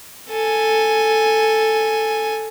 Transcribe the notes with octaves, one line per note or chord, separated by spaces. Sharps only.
A4 G#5